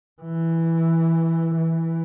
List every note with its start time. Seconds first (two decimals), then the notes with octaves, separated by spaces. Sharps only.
0.22 E3
1.56 E3